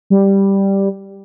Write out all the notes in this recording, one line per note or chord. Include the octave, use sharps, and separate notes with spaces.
G3